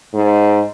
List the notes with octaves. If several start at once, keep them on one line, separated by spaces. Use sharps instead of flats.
G#2